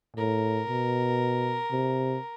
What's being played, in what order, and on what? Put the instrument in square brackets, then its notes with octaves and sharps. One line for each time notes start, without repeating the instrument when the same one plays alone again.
[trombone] A2 [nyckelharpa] A#4
[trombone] B2
C3